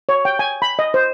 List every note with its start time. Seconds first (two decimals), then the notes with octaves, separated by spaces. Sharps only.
0.09 C#5
0.25 G5
0.39 G#5
0.62 B5
0.79 D#5
0.94 C5